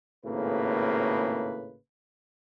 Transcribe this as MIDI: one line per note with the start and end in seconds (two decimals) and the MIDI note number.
0.25 1.76 32
0.25 1.76 45
0.25 1.76 49
0.25 1.76 58
0.25 1.76 71